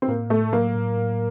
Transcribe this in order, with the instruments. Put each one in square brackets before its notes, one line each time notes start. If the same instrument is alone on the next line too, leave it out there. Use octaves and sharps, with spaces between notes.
[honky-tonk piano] C4
[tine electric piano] A2 [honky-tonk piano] A#3
[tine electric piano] A2 [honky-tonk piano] A3
[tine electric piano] F#3 [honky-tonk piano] A#3
[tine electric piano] A2
A2